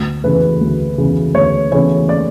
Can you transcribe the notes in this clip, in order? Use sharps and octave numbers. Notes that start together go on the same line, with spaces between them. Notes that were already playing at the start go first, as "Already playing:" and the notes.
Already playing: D2
C#3 E3 A3 E4 B4
D2
C#3 E3 A3 E4
D2 C#5
C#3 E3 A3 E4 C#5
D5